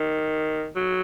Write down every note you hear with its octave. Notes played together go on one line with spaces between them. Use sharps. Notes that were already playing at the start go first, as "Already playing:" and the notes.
Already playing: D#3
F#3